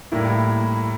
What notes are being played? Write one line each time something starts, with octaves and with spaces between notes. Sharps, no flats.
A2 G3 A#3 E4